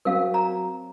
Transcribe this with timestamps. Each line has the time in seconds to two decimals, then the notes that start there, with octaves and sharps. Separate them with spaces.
0.05 F#3 C4 A#4 F5
0.34 A#5